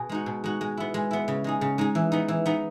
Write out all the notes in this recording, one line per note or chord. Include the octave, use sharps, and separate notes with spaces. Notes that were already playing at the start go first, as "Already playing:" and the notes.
Already playing: B2 G#4
G#3 D#4 F#4
B2
G#3 D#4 F#4
G#3
B3 E4
G#3
B3 E4
C#3
G#3 D#4 G#4
C#3
G#3 D#4 G#4
E3
B3 D#4
E3
B3 D#4